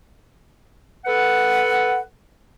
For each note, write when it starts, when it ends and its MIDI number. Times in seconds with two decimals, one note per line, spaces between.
1.05 1.98 69
1.05 1.98 71
1.05 1.98 78